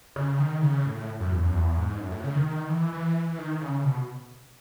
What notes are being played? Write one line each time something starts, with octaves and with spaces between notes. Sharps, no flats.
C#3
D#3
C#3
A2
F#2
E2
F#2
E2
G#2
F#2
A2
C#3
D#3
D#3
E3
E3
D#3
C#3
B2